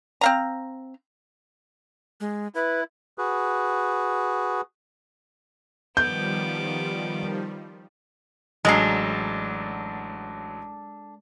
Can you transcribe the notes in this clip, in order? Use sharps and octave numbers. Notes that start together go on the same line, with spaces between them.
C4 F5 A#5
G#3
E4 B4
F#4 G#4 B4
D#3 F3 G3 B3 D6 G6
A1 F#3 G#3 D4 A4 A#5 C7